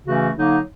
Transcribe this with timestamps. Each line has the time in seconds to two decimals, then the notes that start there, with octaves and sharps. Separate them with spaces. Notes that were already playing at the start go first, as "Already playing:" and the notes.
0.07 C#3 E3 A3 C#4 F#4
0.36 D3 F#3 A#3 D#4